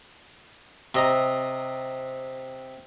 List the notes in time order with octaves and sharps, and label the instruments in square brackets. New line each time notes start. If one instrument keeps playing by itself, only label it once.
[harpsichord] C3 D#5 A#5